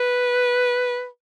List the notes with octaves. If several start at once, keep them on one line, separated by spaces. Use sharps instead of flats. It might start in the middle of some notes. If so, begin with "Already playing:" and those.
Already playing: B4